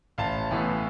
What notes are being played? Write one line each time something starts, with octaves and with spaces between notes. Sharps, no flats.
A1 F5 A5
A2 E3 B3